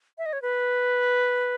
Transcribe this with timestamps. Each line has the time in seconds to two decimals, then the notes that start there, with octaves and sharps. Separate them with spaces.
0.18 E5
0.26 D#5
0.33 C#5
0.42 B4